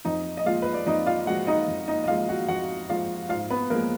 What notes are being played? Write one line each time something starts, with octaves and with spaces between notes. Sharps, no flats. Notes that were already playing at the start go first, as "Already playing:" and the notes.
F2 D#4 D#5
D#5
F3 G#3 F4 F5
B4
D5
F2 D#4 D#5
F4 F5
F3 G#3 F#4 F#5
D#4 D#5
F2
D#4 D#5
D#5
F3 G#3 F4 F5
F#4 F#5
F2 F#4 F#5
F3 G#3 F4 F5
G#2 F4 F5
B3 B4
F3 G#3 A#3 A#4